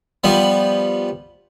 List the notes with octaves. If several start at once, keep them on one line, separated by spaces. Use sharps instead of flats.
F3 G3 B3